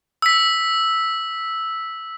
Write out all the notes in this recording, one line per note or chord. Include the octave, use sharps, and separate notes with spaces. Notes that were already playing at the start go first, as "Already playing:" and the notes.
E6 B6